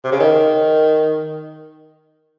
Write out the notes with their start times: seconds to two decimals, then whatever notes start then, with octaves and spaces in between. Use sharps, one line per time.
0.04 C3
0.12 C#3
0.20 D#3